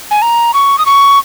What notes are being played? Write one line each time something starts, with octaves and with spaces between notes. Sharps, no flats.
G#5
A#5
C#6
D#6
C#6